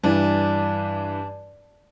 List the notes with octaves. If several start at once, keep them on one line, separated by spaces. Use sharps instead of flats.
G2 E3 D4